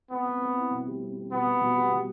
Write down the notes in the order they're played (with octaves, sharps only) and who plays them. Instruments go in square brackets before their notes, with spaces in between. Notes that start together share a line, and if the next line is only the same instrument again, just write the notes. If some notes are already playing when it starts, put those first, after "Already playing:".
[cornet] B3 [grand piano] C4
[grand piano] C4
C4
E4
B2
G3
C4
C4
[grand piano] B2 [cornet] B3
[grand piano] B2
B2
G3
G3